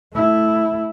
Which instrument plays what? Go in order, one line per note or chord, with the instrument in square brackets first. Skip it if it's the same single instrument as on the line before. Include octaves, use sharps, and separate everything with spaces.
[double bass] A3 E4